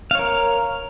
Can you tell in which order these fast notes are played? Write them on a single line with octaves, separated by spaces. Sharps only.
F5 C#5 A#4